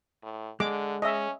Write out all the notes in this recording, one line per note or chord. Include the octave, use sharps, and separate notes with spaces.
A2
D3 G#3 D6
C#4 D#5 E5